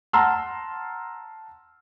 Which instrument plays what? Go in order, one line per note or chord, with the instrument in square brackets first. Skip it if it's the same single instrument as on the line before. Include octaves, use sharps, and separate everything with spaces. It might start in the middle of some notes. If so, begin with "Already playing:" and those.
[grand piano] F#5 A5 A#5 C6 E6 F6